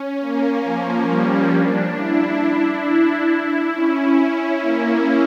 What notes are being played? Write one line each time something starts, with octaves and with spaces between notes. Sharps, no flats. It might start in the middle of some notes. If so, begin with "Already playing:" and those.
Already playing: C#4
A#3
F3
G3
D4
E4
E4
E4
E4
C#4
C#4
A#3